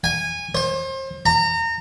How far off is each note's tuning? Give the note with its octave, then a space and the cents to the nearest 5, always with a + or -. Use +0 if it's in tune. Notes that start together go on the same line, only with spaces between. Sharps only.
G#5 -20
C5 +35
A#5 -30